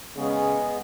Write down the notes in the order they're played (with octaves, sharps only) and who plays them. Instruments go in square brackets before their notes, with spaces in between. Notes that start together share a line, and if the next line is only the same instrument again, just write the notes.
[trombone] C#3 [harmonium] G#3 B3 G#4